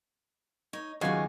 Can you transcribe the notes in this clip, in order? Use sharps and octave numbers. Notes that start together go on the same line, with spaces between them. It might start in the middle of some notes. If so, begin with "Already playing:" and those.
D#4 C#5
D#2 C#3 F#3 B3 F4 F#4 G#5